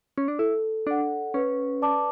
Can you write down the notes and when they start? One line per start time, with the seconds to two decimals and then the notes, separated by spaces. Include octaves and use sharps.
0.18 C#4
0.28 D4
0.39 E4 A4
0.87 D4 D5 F#5
1.34 C#4 B4
1.82 D5 A5 D6